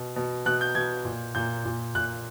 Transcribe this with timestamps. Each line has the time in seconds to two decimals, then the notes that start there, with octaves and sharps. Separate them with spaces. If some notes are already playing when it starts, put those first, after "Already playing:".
Already playing: B2
0.16 B2
0.46 B2 F#6
0.61 G6
0.75 B2 G#6
1.05 A#2
1.35 A#2 G6
1.65 A#2
1.95 A#2 F#6